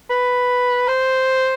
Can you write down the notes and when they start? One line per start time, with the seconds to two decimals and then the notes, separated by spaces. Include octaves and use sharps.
0.10 B4
0.88 C5